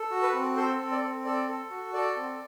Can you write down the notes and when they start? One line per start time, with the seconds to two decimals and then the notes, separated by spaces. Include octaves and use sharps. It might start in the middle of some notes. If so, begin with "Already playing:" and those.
Already playing: A4
0.11 F#4
0.23 B4
0.34 C4
0.57 A4 C5
0.79 C4
0.92 D5
1.03 C4
1.25 A4 D5
1.49 A4
1.71 F#4
1.93 A4 D5
2.17 C4